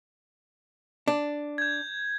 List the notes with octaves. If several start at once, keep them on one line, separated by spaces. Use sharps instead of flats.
D4
G6 G#6